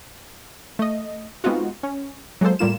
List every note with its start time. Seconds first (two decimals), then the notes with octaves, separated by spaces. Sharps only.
0.79 A3 D#5
1.44 G#3 B3 C4 D#4 F4 F#4
1.83 C#4
2.41 F#3 G#3 A#3 A4 C5
2.59 A2 G3 A#3 F4 E7